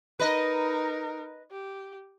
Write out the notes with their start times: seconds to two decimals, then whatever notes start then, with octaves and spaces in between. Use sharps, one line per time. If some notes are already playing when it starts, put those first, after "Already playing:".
0.20 D#4 A#4 B4 D#5
1.51 G4